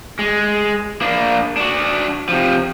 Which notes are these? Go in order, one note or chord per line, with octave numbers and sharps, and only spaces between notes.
G#3
A#3 D4
D4 F#4
C3 F3